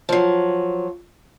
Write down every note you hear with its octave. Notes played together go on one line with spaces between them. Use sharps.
F3 F#3